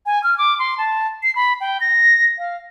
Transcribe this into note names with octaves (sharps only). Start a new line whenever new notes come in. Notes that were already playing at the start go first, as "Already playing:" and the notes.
G#5
F6
D6
C6
A5
C7
B5
G5
A#6
F5